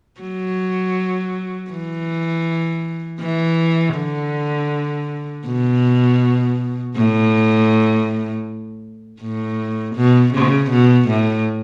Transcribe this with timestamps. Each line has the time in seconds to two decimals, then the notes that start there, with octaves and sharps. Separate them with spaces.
0.21 F#3
1.71 E3
3.21 E3
3.96 D3
5.46 B2
6.96 A2
9.21 A2
9.96 B2
10.34 C#3
10.71 B2
11.08 A2